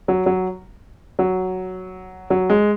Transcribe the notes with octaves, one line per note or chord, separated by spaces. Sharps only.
F#3
F#3
F#3
F#3
G#3